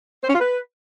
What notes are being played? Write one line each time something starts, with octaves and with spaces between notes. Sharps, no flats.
C5
C#4
F4
B4